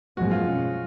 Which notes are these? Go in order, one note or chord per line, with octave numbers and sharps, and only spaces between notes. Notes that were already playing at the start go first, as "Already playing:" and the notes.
F#2 F3 G#3 B3 F#4
F4
B2 G#3 C#4